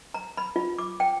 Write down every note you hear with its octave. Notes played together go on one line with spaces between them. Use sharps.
A#5
B5
F4
D6
G5